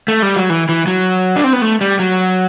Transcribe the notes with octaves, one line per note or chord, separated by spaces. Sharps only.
A3
G3
F#3
E3
E3
F#3
D4
C4
B3
A3
G3
F#3